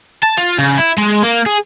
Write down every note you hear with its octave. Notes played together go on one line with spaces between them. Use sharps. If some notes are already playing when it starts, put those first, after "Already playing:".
A5
F4
C#3
E4
G#3
A#3
G#4